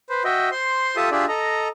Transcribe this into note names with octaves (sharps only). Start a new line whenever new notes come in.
B4 C5
F#4 D#5 E5 G5
C5 C6
F4 G4 A4 E5 A5 D#6
D4 F4 G4 G#4 D5 E5
A4 D#5 A#5